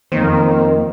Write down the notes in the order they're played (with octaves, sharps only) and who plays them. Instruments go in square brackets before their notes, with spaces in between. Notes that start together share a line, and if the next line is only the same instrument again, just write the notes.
[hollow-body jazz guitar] F2 C5 [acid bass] D#3 [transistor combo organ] A#3 C4